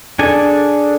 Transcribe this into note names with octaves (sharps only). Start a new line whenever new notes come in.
D4 G#4 A4 G#5